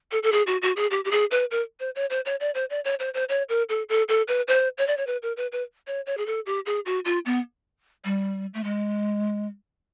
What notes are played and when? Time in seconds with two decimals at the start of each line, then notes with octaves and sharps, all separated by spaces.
0.12 A4
0.23 A4
0.32 G#4
0.47 F#4
0.62 F#4
0.76 G#4
0.91 G4
1.05 G4
1.11 G#4
1.31 B4
1.51 A#4
1.80 C5
1.95 C#5
2.10 C5
2.25 C#5
2.40 D5
2.55 C5
2.70 D5
2.85 C#5
3.00 C5
3.14 C5
3.29 C#5
3.49 A#4
3.69 A4
3.89 A4
4.09 A4
4.28 B4
4.48 C5
4.78 C#5
4.87 D5
4.97 C#5
5.07 B4
5.22 A#4
5.37 B4
5.52 B4
5.87 C#5
6.06 C#5
6.17 G#4
6.26 A4
6.46 G4
6.66 G#4
6.86 F#4
7.05 F4
7.26 B3
8.05 G3
8.54 A3
8.64 G#3